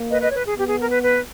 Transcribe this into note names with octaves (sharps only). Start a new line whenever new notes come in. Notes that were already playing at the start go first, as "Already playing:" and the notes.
Already playing: A#3
B4 D#5
B4 D#5
C#5
B4
G#4
B3 G4
G#4
A#4
B4
B4